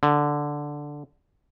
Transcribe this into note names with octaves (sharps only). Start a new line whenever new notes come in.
D3